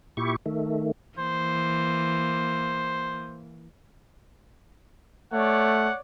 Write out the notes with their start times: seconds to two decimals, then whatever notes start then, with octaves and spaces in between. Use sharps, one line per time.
0.17 A#2 E4 G4 C#6
0.46 D#3 A3
1.18 E3 A#3 C5
5.33 A3 C#5 D5 F#5